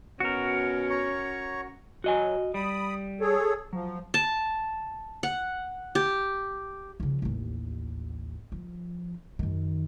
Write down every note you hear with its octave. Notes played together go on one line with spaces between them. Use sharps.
B2 C#4 F#4 A#4
C#5 A#5 C#6
F#3 F#4 D#5 G#5
G3 B5 D#6
G#4 A4 C#5
F3 F#3
A5
F#5
G4
C#3 F3
A1 D#2
F3
F#2 D#3